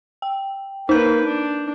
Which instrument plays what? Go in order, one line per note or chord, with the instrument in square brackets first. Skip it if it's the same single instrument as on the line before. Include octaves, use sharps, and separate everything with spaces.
[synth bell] G5
[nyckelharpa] A#3 B4 [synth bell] D#4 G6
[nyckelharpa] D4